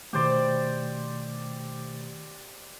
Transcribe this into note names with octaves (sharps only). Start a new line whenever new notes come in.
B2 D#3 A3 G4 C5 D5